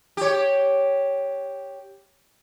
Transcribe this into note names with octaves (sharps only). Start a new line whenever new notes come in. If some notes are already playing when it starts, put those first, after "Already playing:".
G4 C#5